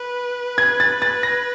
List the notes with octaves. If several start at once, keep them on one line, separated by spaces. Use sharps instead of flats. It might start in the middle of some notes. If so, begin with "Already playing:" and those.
Already playing: B4
G#6
A6
A6
A#6